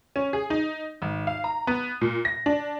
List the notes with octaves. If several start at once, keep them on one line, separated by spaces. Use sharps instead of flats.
C#4
G#4
D#4
G#1
F5
A#5
B3
A#2
A#6
D4